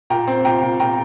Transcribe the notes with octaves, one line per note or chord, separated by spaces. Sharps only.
A#2 G5 A#5
C4
A#2 G5 A#5
A#2
A#2 G5 A#5